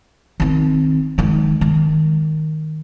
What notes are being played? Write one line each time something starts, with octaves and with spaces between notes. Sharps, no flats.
D#3 C4
D#3 G#3
D#3